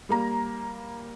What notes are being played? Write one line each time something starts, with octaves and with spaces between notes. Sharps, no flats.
G3 A#3 A#5